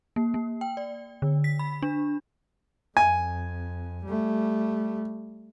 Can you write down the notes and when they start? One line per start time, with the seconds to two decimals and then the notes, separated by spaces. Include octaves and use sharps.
0.16 A#3
0.34 A#3
0.61 G5
0.77 D5
1.22 D3
1.44 B6
1.59 B5
1.82 D4
2.97 F2 G#5
4.06 G3 A3